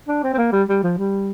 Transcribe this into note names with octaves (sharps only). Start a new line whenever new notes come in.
D4
C4
C4
A#3
G3
G3
F3
G3